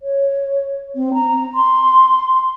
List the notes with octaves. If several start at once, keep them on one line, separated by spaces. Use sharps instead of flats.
C#5
C4
A#5
C6